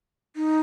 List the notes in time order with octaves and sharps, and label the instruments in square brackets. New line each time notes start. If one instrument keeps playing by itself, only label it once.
[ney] D#4